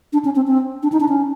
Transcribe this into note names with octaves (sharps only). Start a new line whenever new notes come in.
D4
C#4
C4
C4
D4
D#4
D4
C#4